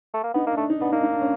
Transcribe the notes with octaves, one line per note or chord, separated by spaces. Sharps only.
A3
A#3
B3 D#4
A#3
D4
A3
D#4
B3 D4
A#3 D#4
D#4
D4
C#4